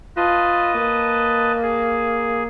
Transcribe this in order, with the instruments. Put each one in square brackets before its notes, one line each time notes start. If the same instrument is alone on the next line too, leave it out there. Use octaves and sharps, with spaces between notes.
[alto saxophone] F4 [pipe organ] B4 D#5 A5
[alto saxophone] A#3
[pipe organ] G#4